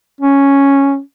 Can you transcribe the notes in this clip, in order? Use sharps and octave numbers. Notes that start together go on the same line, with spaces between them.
C#4